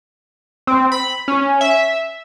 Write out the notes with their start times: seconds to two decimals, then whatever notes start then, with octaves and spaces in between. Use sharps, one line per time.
0.67 C4
0.92 B5
1.28 C#4
1.61 E5